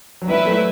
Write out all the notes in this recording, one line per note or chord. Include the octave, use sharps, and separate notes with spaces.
F#3
E3 G3 E4 B4 E5
F#3 A3